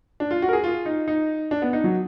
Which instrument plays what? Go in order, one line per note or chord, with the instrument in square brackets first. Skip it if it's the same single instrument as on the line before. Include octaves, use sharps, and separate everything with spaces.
[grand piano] D4
F4
F#4
A#4
G#4
F4
D#4
D#4
D4
B3
D#4
F#3